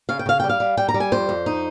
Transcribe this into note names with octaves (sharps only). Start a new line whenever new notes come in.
C#3 F5
G5
C#3 F5
G3 G5
F5
G3
G3 G5
A#5
G3
G#5
F2 C5
F2
D#4